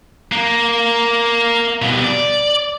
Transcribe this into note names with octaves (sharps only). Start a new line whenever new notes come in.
A#3
B2 G3
D5